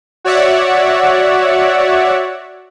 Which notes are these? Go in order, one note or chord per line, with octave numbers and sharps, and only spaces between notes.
F#4 C#5 D5 E5 F#5